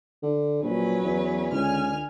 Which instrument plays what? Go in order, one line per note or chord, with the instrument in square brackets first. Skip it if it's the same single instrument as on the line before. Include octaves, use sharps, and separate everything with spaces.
[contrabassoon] D3
[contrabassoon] A#1 [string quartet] F#3 C#4 B4
[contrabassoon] E2
[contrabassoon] C#2 [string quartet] D3 G#5 F6